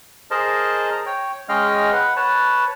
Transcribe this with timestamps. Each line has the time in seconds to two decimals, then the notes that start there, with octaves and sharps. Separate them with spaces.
0.31 G#4 A#4 C5 D#5 A5
0.92 A#5
1.06 C#5 G5
1.49 G#3 C#4 D#5 F5 G5 F6
1.92 B4 F#5
2.16 B4 C#5 A5